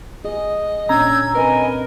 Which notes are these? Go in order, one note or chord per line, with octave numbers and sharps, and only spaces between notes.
G#4 D#5
A#2 C#4 D4 A#5 E6 G6 G#6
C4 A#4 B4 D#5 G#5